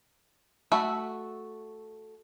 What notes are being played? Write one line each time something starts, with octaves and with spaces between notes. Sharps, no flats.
A3 F#4 E5 B5